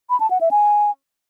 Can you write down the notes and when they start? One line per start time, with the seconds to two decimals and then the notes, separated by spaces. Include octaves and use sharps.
0.10 B5
0.20 A5
0.31 F#5
0.41 E5
0.51 G#5